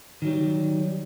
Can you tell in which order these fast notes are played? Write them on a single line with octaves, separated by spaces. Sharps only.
D#3 F#3 G3